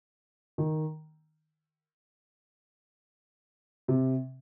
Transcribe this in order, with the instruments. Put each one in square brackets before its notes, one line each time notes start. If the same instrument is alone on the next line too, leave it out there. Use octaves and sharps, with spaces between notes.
[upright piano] D#3
C3